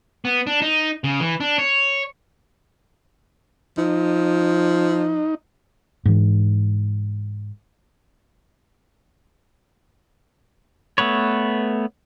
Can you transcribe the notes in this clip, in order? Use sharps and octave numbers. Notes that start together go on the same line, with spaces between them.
B3
D4
D#4
C#3
E3
D4
C#5
F3 D#4
G#2 E3
A3 B3 B4 C#5